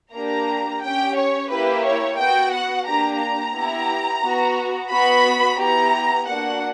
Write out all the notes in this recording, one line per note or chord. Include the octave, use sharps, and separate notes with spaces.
A#3 D4 G4 A#5
C#4 G4 G5
C#5
A#3 E4 G4 B4
C#5
B3 F#4 G5
F#5
A#3 D4 G4 A#5
A#5
B3 E4 G4
B3 F#4
B3 F#4 B5
B3 E4 G4 A#5
A#3 D4 F#4 F#5